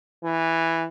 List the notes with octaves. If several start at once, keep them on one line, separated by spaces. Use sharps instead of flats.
E3